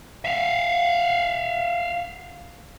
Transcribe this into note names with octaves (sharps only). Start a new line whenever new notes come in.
E5 F5